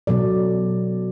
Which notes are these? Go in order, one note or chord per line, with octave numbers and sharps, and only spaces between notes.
B2 F#3 A4 D5